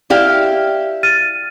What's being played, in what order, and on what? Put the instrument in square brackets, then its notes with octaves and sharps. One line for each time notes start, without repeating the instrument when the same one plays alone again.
[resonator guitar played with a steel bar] E4 G4 F5 [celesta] D5
[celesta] F6 A6 D#7